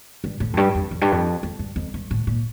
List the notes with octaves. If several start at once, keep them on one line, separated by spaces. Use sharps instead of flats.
G2
A2
F2
G2
F2
F2
G2
F2
F2
G2
F2
G2
A2
A#2